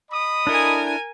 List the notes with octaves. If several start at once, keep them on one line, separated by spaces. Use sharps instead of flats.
D#5 B5 D#6
D4 E4 A4 A#4 G#5